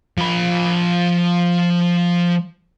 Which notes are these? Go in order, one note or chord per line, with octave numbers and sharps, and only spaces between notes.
F3 B5